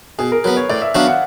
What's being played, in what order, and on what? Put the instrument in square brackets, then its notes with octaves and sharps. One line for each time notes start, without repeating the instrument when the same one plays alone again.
[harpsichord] B2 [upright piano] G#4
[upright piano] A#4
[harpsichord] F#3 B3 [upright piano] B4
[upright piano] C#5
[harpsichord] A2 [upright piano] D5
[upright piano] E5
[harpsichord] F#3 B3 D4 F#4 [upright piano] F5
[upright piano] F#5